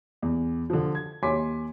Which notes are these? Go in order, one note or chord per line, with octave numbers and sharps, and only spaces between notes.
E2
D3 F3
G#6
D#2 C#5 G#5 C6 D6 B6